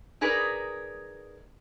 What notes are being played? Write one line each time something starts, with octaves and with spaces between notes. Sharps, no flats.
D#4 G#4 A#4 B4 D5